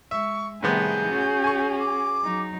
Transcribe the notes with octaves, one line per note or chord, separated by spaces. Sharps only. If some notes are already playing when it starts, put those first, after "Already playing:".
G#3 E5 C#6
A2 C3 D#3 G3 B3 G#4 G6
C#4 F#4
G#5 C#6
D6
F#3 D#4